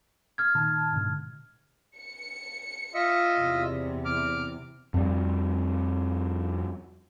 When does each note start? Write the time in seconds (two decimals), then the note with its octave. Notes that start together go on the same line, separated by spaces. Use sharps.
0.38 F6 G#6
0.55 A#2 D#3 A5
0.93 G#2 B2 D3
1.96 C#7
2.94 F4 D#5 E5
3.39 E2 C3
4.05 D6 F6
4.94 F2 G3